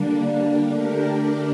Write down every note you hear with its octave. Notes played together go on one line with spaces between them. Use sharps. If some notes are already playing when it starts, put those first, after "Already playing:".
Already playing: D3 G3 A#3 D4
D3 A3 D4 G4 A#4